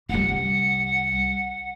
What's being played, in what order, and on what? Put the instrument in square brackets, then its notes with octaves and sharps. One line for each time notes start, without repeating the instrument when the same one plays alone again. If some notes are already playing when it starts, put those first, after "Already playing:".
[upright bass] C2 G3 [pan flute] F#5